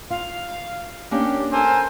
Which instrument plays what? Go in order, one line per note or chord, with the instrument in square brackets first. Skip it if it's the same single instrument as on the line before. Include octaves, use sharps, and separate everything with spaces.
[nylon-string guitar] F4 [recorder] F5
[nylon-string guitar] A#3 C#4 D4 [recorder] G4
[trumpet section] A4 A#4 C5 [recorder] G#5